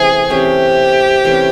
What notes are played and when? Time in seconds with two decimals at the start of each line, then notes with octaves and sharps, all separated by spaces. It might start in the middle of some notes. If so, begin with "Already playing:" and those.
Already playing: C3 E3 A3 C#4 G#4
0.30 C3 E3 A3 C#4 G4
1.24 C3 E3 A3 C#4